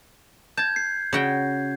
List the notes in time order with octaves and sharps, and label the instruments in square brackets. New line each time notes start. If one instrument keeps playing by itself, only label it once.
[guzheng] A5 [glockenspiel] G6 G#6
[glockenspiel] C7
[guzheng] C#3 F#4 G5